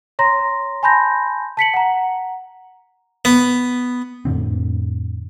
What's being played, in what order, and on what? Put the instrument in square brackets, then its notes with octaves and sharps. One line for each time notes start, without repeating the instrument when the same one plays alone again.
[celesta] C#5 A#5 C6 A#6
G#5 A5 B5 C6 G6 A#6
A5 B6 C#7 F#7
F#5 A#5
[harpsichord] B3
[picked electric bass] F2 A2 D3 C4